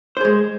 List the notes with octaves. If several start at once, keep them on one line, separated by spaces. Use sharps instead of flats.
G#3 G#4 C5